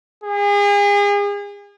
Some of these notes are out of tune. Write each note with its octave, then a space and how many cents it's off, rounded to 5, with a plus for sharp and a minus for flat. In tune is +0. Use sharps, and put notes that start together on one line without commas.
G#4 -35